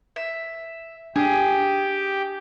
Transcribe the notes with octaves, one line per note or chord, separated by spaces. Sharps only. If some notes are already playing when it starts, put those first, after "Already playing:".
E5
D4 G4 G#4